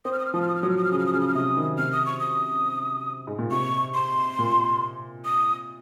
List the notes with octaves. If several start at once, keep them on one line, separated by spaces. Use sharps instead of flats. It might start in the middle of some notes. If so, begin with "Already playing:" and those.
C4 D#6
F6
D#6
F6
F3 D#6
F6
D#6
F6
F#3 D#6
F6
D#6
F6
C#3 D#6
F6
D#6
C#3 F6
D#6
F6
C3 D#6
D#3
C3 F6
D#6
C#6
D#6
G#2
A#2
C3 C#6
C6
A#2
D#6